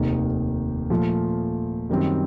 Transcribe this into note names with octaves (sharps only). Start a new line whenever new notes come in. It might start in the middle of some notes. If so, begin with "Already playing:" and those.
Already playing: F1 D#2 D#3
A#2 F3 A3
F#2 D#3 G3 C4